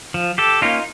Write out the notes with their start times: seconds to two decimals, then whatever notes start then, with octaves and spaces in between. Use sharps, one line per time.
0.14 F3
0.38 G4 A4
0.61 A#3 C#4 D#4 F4